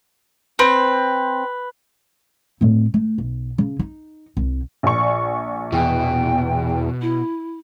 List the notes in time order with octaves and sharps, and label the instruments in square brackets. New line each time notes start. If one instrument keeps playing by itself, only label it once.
[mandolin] C4 [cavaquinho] B4
[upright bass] A2 C4
A3
B1
C#3
D#4
C2
[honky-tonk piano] A#1 D5 C#6
[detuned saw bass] E2 [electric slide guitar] B2 [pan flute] G5
[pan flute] E4